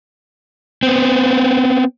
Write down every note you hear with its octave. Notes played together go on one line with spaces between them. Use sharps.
B3 C4